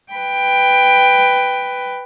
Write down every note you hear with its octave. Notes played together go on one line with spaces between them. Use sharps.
B4 G5